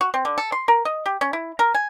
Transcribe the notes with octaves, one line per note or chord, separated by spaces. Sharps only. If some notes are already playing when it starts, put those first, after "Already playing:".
F#4
C4
D3
A4
C6
A#4
D#5
G4
C#4
E4
A#4
G#5